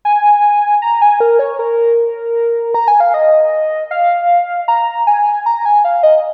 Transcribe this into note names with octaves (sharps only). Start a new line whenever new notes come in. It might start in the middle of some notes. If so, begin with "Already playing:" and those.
G#5
A#5
G#5
A#4
C#5
A#4
A#5
G#5
F5
D#5
F5
A#5
G#5
A#5
G#5
F5
D#5